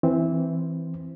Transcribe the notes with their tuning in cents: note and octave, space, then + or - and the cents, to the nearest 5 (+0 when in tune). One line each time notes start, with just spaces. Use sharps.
E3 +0 C4 +0